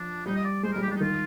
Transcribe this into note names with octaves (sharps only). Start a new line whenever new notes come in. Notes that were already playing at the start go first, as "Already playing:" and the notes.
Already playing: F3 D4
G3 D#4
D#5
D5
G#3 C5
G3 A#4
G4
G3 D4
D#4
D#3 F4